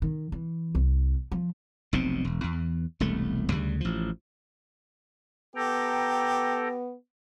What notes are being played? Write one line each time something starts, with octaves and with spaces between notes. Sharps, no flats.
D#3
E3
C2
F3
F1 B1 B2 C4
E1
E2
E1 C2 A3
D2 C#3 G3
A1 F3
B3 G4 A4 G5 A#5